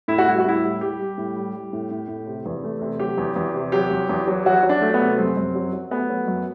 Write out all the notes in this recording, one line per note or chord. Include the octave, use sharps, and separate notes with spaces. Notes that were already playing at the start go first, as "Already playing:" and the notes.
A2 E4
F#4
G3 E4
F#4
A2 E4
G3
G3 G4
G3
A2
G3
G3
A2
A2
A2
C3
E2
A3
C3
F#3 G4
E2
E2
C3
F#3 G4
E2
E2
F#3
F#3 F#4
F#3
D4
A3
B3
C3
F#2 C4
F#2
F#3
F#3
A3 B3
F#3
F#2